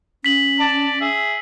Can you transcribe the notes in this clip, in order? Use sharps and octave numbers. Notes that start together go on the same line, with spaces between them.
C#4 B6 F#7
D5 A5
G#4 E5